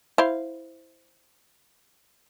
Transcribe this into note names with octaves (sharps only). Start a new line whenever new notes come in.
E4 C5 F5